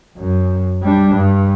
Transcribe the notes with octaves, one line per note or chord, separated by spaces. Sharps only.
F#2
G3 D4
G2